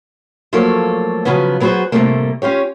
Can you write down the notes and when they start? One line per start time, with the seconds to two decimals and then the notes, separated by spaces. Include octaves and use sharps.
0.53 F3 F#3 A3 A#3 A4 C#5
1.25 C#3 F3 F#3 B3 C#4
1.60 F#3 B3 E4 F#4 G#4 C5
1.92 A2 C3 F3 G3 A3 A#3
2.42 C#4 F4 G4 C#5